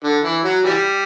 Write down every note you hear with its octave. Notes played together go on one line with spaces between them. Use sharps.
D3
E3
F#3
E3 G3